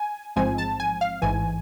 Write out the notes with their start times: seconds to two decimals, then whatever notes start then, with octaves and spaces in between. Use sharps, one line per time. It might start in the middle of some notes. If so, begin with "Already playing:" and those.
Already playing: G#5
0.36 A1 G#2 F3 G#3 C4 G#5
0.58 A5
0.80 G#5
1.01 F5
1.22 A1 G#2 E3 G#5